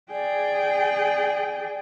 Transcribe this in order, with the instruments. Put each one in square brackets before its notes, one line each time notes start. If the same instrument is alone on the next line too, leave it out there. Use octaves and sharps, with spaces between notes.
[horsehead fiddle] G#4 G5 [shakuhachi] D5